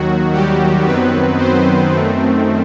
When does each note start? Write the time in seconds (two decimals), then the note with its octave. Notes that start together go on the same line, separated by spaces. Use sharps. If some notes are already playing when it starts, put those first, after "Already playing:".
Already playing: D#2 D#3 F#3 F#4
0.32 G3 G4
0.85 F#2 D#3 F#3 B3 C4 B4
1.38 C4 C5
1.91 F#2 D#3 A3 C4